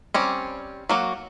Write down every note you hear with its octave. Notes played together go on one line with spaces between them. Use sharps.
G3 C4 C#4
F#3 A#3 F#4